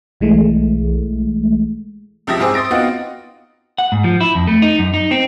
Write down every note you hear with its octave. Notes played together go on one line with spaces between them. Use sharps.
B1 E3 G#3 A3
C#2 C3 F3 E5 D#6 A#6
G#2 C4 C5 G#5 D6 E6
C6 D#6 A6 A#6 D7
B3 C4 D#4 F4 F#4
F#5
G#2
F3
E4
F2
A3
D#4
F#2
D#4
C4